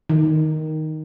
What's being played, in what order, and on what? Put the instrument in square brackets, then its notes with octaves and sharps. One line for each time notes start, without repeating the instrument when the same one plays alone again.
[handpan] D#3